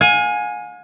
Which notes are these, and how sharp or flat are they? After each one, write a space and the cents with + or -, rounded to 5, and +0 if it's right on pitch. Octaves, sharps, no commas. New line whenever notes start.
F5 +45 G#5 +0